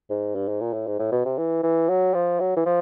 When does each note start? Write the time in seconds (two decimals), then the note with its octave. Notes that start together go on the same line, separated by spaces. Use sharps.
0.10 G#2
0.35 G2
0.48 G#2
0.61 A#2
0.73 A2
0.87 G#2
0.99 A2
1.12 B2
1.25 C3
1.38 E3
1.63 E3
1.89 F#3
2.14 F3
2.40 F#3
2.57 E3
2.66 F3